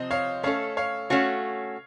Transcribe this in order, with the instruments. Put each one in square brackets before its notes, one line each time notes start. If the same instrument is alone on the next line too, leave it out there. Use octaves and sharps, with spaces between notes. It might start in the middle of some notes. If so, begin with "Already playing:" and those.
Already playing: [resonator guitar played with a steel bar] C3 F3 C4 [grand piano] C5 D#5
[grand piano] C#5 F5
[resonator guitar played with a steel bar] A3 C#4 A4 [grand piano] C#5 F5
[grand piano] C#5 F5
[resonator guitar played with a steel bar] A3 C#4 F#4 [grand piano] C#5 F5